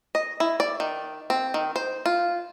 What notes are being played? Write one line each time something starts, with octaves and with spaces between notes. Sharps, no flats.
D#5
E4
D5
D#3
C4
D#3
C5
F4